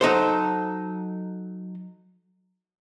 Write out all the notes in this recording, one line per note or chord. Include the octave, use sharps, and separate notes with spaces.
F#3 D#4 A4 C5